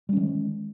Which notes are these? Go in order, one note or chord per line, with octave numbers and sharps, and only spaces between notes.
D#3 G3 G#3 C#4